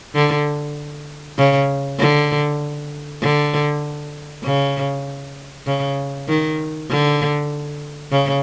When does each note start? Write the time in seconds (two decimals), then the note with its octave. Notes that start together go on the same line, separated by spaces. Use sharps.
0.15 D3
1.38 C#3
1.99 D3
3.22 D3
4.44 C#3
5.67 C#3
6.28 D#3
6.90 D3
8.12 C#3